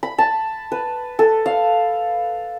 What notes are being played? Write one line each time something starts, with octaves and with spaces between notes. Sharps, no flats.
B5
A5
B4
A4
F5